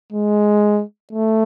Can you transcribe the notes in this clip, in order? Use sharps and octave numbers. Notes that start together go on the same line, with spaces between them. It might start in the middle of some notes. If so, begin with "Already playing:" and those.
G#3
A3